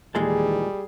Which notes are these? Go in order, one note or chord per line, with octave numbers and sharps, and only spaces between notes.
D#2 A#2 E3 G3 G#3 G#4 A4